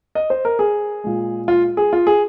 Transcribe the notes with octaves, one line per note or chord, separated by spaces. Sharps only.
D#5
C5
A#4
G#4
A#2 G#3
F4
G#4
F4
G#4